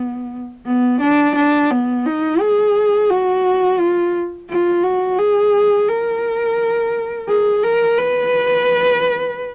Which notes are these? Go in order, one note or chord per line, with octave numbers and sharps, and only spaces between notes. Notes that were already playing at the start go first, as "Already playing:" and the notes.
Already playing: B3
B3
D4
D4
B3
D#4
G#4
F#4
F4
F4
F#4
G#4
A#4
G#4
A#4
B4